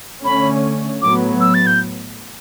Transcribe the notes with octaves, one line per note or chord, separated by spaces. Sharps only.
D3 A3 C#4 B5
A2 F#3 B3 D6
E6
A6
G6